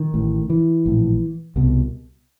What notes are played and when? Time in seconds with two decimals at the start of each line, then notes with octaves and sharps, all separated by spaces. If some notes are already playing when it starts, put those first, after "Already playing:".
Already playing: D#3
0.14 A1 A2
0.50 E3
0.86 A#1 A2
1.56 C2 B2